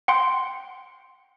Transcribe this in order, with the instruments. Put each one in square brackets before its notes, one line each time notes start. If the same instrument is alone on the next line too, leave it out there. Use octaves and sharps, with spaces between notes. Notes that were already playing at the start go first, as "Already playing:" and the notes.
[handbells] F#5 G5 C6